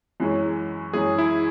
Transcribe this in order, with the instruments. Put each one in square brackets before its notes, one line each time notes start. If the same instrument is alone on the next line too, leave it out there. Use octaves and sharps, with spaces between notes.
[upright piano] F#2 E3 G#3 C#4
[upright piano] F#2 E3 G#3 C#4 [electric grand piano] G#4
[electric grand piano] E4